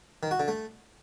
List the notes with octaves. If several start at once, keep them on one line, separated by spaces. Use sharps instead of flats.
D#3
F#4
D3
A3